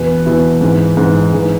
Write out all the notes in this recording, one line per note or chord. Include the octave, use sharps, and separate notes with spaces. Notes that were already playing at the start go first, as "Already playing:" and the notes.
Already playing: E2 B2 B4
E2 B2 E4
G#2 E3
G#2 E3
G#2 E3